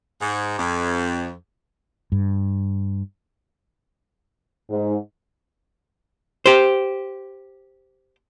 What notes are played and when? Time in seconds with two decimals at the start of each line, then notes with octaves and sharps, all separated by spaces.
0.21 G#2
0.59 F2
2.12 G2
4.70 G#2
6.46 G4 C5